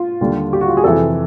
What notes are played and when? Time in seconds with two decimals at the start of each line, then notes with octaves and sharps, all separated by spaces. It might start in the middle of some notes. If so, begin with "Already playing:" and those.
Already playing: F4
0.21 D#2 D3 G3
0.53 G4
0.61 F#4
0.68 F4
0.77 G#4
0.84 F2 C3 E3 A4